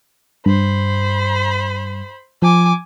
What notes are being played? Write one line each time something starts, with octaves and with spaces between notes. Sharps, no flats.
G2 C5 B5
F3 G#5 D6